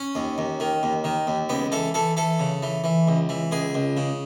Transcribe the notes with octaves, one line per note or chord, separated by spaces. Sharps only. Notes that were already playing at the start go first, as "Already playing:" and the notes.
Already playing: C#4
D#2
D#2
D#3
D#2
D#3
D#2
C#2 B3
E3 A4
E3 A4
E3 A4
C#3
E3
E3
C#2
E3
C#2 G#4
C#2
C#3